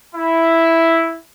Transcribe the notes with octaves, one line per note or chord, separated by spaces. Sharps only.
E4